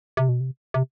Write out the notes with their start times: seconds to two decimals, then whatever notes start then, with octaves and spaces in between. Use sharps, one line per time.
0.17 C3
0.29 B2
0.40 C3
0.74 C3